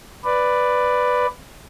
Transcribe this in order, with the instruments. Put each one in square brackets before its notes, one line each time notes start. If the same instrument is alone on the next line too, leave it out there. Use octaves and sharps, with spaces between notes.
[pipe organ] B4 D5